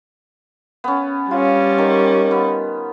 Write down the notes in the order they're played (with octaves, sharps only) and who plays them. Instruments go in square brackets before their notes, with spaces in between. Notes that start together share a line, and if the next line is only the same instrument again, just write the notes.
[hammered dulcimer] B3 C#4
[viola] G3 C#4 [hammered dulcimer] F4
[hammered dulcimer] D#3
B3